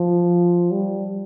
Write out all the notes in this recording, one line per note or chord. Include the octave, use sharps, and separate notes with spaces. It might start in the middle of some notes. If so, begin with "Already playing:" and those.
Already playing: F3
G3